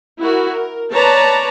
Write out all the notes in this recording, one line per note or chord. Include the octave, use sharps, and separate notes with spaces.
E4 F#4 A#4
A#4
B4 C#5 D5 A5 A#5